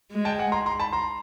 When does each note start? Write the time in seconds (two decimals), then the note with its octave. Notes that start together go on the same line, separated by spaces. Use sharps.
0.12 G#3
0.25 G5 A5
0.39 F#5 G#5
0.52 A#5 C6
0.66 A#5 C6
0.80 A5 B5
0.92 A#5 C6